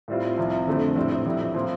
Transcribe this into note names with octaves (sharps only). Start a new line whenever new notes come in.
A2 G3 C4 F4
C2 C3 F3
F2 D3 A3 C4
A#1 A2 G3 C4
A#1 A2 G3
A#2 F3 C4